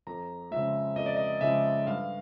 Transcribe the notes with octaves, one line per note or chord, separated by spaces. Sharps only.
F2 A#5
C#3 F3 G#3 E5
F2 D#5
D5
D#5
C#3 F3 G#3 E5
G2 F5